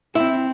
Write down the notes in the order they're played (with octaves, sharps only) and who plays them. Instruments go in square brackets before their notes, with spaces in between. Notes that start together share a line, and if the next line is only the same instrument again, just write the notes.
[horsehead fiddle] C4 [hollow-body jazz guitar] E4